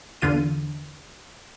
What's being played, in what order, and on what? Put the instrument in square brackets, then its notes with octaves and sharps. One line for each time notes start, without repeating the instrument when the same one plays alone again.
[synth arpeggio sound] E2 D3 F4 D#7